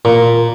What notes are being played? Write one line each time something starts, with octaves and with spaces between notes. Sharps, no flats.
A#2